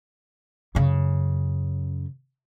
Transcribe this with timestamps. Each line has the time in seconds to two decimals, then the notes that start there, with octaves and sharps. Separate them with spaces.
0.75 F#2 C#3